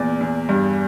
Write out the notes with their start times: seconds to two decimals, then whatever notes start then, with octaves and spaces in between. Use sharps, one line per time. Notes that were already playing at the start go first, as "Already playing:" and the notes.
Already playing: E2 A#2 D5
0.21 E2
0.49 G2